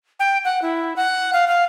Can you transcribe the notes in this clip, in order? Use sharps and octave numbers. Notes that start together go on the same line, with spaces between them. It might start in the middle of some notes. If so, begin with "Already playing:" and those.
G5
F#5
E4
F#5
F5
F5